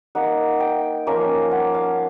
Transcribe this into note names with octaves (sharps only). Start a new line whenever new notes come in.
A#3 D#4 F#5
G5
F3 A#3 C#4
F#5
F5